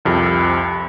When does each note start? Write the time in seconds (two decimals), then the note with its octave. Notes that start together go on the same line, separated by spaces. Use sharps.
0.05 C2 F2 C3